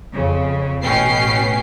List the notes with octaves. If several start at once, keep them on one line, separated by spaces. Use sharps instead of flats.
F2 C#3
A1 B2 C#4 G5 C7